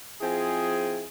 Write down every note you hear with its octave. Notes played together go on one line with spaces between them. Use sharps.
F3 C4 E4 G#4